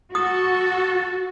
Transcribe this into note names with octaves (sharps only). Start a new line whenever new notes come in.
F#4 A4 D#6